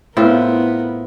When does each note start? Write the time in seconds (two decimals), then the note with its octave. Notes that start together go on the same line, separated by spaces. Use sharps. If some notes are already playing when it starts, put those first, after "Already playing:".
0.17 A2 B3 C4 F4 A#4